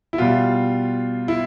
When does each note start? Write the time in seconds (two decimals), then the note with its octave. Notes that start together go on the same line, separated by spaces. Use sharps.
0.13 E4
0.18 B2 G3 F4
1.28 E4